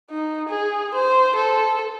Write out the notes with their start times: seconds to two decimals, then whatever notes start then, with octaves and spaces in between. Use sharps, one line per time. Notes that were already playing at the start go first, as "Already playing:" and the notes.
0.10 D#4
0.49 G#4
0.94 C5
1.35 A4